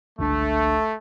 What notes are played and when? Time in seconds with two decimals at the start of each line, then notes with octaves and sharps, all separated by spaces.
0.19 G1 C#2 A3 D4